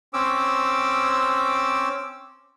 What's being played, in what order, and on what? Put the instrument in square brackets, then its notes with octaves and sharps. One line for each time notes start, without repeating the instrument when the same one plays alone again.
[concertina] C4 C#4 D6 E6